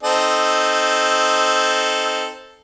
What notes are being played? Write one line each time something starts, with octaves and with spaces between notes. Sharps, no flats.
C4 D#4 A4